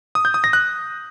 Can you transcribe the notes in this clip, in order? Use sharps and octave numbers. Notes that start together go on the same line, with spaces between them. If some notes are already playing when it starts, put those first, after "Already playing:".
D#6
G6
D#6
A#6
F#6